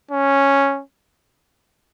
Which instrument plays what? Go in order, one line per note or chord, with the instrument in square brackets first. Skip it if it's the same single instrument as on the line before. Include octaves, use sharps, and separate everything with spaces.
[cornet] C#4